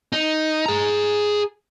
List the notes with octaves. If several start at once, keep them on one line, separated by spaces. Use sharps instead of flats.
D#4
G#4 A#5